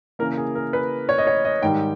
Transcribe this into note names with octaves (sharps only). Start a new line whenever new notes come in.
C#3 E3 A#3 A#4
G#4
A#4
B4
C#5
D#5
C#5
D#5
G#2 D#3 G3 G5